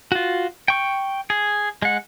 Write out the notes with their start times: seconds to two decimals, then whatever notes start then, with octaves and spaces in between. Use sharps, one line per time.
0.12 F4 F#4
0.68 G5 C#6
1.30 G#4
1.82 G#3 F#5